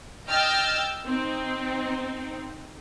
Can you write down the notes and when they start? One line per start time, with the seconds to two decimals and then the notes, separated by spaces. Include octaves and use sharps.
0.29 D#5 G5 E6 F6 G6 A6
1.05 C4 D#4